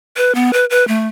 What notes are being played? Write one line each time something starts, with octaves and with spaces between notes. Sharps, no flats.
B4
B3
B4
B4
A3